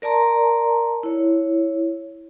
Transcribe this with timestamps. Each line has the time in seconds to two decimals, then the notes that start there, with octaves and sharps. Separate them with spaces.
0.02 A#4 D5 A5 A#5 C6
1.03 E4 C#5